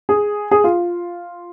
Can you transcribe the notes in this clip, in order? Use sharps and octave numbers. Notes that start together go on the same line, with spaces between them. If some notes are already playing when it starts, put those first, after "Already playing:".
G#4
G#4
F4